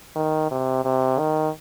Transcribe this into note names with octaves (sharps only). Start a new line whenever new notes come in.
D#3
C3
C3
D#3